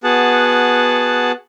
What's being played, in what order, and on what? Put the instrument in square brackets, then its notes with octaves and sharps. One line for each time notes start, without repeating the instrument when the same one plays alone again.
[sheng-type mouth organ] B3 F#4 G#4 F#5 A5